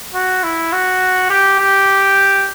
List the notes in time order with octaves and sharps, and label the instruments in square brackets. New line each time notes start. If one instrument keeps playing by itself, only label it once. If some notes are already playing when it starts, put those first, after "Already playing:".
[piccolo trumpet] F#4
E4
F#4
G4
G4